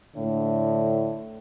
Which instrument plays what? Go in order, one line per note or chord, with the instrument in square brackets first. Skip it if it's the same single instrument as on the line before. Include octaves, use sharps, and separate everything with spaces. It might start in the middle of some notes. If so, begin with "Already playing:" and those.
[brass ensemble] A2 D3